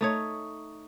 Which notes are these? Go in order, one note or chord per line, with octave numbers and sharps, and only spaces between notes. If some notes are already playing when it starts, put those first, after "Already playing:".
A3 D#4 C#5